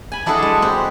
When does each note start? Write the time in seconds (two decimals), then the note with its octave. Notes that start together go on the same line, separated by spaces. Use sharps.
0.12 G#5 B5
0.26 D4 E4 F#4 G#4 A4 D#5
0.42 G#3
0.62 C4 G4